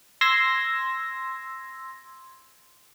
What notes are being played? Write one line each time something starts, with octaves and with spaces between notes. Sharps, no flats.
C6 E6 G#6 A#6